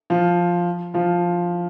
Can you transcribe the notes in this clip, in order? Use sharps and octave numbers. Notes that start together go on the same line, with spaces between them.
F3 F4
F3 F4